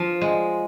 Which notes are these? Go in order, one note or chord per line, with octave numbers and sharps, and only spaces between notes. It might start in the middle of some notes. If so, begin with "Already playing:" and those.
Already playing: F3
G#3